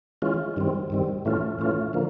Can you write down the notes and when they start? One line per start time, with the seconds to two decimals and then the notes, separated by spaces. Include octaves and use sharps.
0.22 E3 G#3 C#4 F4
0.56 G2 D#3 G3 C4
0.90 G2 D#3 G3 C4
1.25 A2 E3 A3 C#4 F4
1.59 A2 E3 A3 C#4 F4
1.93 D3 F3 A#3